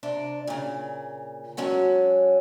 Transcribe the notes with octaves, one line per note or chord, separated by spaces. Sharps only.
C3 D4 D5
A#2 C#3
F#3 G#3 C#4 A4 F#5